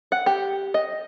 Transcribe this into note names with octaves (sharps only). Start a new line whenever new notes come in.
F#5
G4
D#5